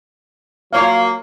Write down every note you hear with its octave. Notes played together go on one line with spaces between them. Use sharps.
F#3 A#3 F4 C#5 F5